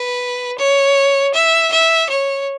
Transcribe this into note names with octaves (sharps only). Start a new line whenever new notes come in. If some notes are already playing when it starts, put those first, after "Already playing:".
Already playing: B4
C#5
E5
E5
C#5